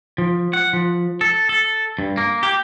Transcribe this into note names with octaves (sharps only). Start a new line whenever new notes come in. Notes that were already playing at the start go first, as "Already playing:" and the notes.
F3
F#5
F3
A4
A4
G2
A#3
G4